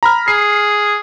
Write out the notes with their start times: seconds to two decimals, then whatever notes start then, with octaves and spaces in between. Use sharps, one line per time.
0.03 A#5 B5 F6
0.28 G#4 C7